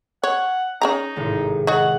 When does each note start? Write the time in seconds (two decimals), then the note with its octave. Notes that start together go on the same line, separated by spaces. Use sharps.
0.24 C#5 F#5
0.82 C#4 D#4 G#4 A#5
1.16 G#1 A2 C3
1.67 D#4 F#4 G#4 F#5